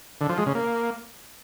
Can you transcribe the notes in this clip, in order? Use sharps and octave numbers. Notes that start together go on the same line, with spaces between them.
D3
F3
G#3
C#3
A#3